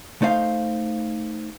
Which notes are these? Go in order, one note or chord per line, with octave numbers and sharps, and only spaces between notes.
A3 D#4 C5 F5